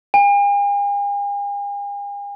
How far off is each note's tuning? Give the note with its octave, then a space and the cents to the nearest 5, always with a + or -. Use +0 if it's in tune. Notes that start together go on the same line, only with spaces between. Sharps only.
G#5 -45